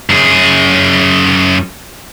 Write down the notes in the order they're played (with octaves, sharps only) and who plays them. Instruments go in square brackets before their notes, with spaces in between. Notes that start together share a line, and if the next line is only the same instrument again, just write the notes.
[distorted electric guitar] F#2 G#4